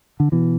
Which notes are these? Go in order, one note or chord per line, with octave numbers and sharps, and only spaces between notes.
D3
B2 E3